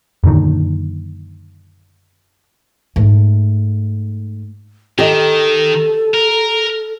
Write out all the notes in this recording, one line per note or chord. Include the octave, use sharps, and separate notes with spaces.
F#2 A#2 D3 D#3
G#2 A3
D#3 G4 A4 D#5
A#4